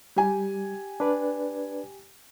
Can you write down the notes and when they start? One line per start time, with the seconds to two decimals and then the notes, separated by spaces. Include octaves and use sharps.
0.16 G3 G4 G#5
1.00 D4 B4 D5